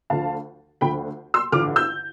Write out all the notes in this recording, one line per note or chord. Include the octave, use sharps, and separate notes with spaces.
D2 D3 F3 F5 A5
D2 D3 F3 G5 B5
C6 E6
A1 G2 D3 F3 D6 F6
E6 G6